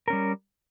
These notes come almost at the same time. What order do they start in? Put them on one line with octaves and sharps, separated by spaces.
A#4 C#4 G3